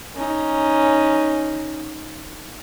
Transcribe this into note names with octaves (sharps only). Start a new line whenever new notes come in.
C#4 D#4